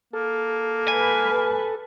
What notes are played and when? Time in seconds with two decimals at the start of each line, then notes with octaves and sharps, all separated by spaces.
0.13 A#3 A4
0.88 B4 G#5